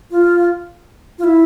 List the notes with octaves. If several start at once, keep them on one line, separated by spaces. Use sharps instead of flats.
F4
F4
E4